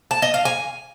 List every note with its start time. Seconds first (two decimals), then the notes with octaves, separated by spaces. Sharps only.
0.11 A5
0.22 D#5
0.34 F5
0.45 G#5